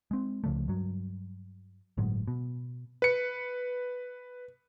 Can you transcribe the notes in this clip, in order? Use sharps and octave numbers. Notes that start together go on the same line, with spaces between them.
G#3 C4
C#2 C#3 F3 A3
G2 F#3
G1 A2 F#3 G#3
B2
B4 C#7